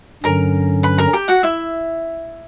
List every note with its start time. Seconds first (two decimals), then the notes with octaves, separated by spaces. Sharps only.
0.24 G2 D3 F#3 C#4 A#4 A#5
0.83 B4 B5
0.98 A#4 A#5
1.13 G4 G5
1.28 F#4 F#5
1.43 E4 E5